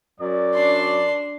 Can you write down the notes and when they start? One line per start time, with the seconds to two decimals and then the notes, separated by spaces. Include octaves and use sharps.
0.21 F#2 F#3 D5
0.54 D4 C6